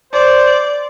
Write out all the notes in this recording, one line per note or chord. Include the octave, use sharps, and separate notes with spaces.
C5 D5